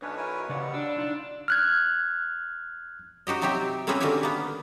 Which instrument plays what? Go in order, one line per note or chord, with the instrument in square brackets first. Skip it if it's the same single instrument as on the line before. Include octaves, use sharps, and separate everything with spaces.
[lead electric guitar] B1 [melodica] C#4 D4 [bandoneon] B4 C#5
[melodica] E4 A#4 G#5
[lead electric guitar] D#2 [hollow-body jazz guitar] C#3 D5 [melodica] G3 F#5
[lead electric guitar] D4 [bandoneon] E6
[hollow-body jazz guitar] B1 D#4 F5 [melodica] F4
[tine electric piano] F6 F#6 G#6
[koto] D#4 F#4 G4 D#5
C3 F#3 C4 D#4 G4 E5
A#3 C4 C#4 F#4 G#4 B4
D3 D#3 A#3 F#4 G4 G#5
A#3 B3